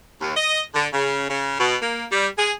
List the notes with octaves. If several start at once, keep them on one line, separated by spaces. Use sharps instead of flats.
D#2
D#5
D3
C#3
C#3
B2
A#3
G3
G#4